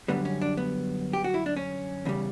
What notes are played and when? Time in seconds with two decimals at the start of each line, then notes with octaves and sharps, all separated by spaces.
0.08 F#2 D3 G3 B3
0.25 C#4
0.42 D4
0.57 B3
1.13 G4
1.24 F#4
1.34 E4
1.46 D4
1.57 C#4
2.05 E2 C#3 G3